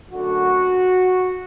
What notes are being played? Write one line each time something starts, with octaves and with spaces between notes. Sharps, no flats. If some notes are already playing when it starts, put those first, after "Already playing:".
F#2 D3 A3 F#4